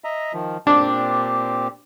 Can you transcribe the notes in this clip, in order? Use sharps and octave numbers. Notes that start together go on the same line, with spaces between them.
D#5 E5 A#5
D#3 F3
A#2 C4 D4 G4